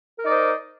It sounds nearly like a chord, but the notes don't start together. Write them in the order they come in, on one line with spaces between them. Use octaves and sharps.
A#4 D#4 D5 D#5 C5